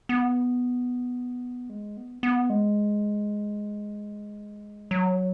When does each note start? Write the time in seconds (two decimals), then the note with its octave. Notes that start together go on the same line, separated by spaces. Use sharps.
0.09 B3
1.70 G#3
1.97 B3
2.23 B3
2.50 G#3
4.91 F#3